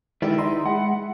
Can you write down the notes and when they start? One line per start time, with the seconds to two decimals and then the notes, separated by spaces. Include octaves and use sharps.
0.22 D#3 G#3 E4 G4 B4 D5 E5
0.38 D#4 E4 E5 B5 C6
0.65 G#3 F#5